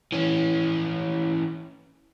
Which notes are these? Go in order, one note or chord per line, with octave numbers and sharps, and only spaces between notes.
E3 C#4